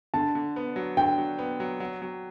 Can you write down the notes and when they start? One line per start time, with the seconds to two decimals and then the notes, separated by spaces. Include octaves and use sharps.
0.14 D3 A5
0.35 D3
0.56 B3
0.76 F#3
0.97 D3 G5
1.18 F#3
1.39 B3
1.60 F#3
1.80 F#3
2.02 F#3